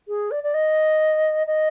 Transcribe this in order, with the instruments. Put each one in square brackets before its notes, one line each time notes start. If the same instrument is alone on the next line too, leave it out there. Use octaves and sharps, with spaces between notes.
[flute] G#4
D5
D5
D#5
D#5